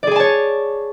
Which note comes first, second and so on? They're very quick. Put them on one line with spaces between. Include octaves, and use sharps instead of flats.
D5 G#4 G#5 A5 C#5